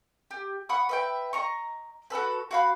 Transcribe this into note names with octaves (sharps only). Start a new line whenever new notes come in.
G4
F#5 B5 C#6 D#6
B4 E5 G5
D#5 A#5 C#6
F#4 G4 A4 B4
F#4 F5 B5